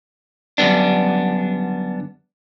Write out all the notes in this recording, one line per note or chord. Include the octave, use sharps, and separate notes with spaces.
F#2 D3 G3 B3 D4